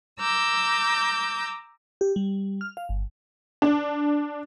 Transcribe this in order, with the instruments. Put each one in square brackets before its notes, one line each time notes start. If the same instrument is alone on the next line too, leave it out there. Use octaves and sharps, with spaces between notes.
[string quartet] A#5 D6 E6 G6
[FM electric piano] G4
G3
F6
F5
G1
[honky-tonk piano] D4